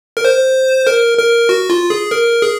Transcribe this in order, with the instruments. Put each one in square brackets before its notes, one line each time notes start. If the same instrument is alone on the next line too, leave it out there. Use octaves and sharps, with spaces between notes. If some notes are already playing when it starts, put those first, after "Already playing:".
[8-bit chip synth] A#4
C5
A#4
A#4
F#4
F4
G#4
A#4
G#4